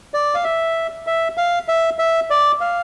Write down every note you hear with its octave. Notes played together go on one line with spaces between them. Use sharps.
D5
F5
E5
E5
F5
E5
E5
D5
F5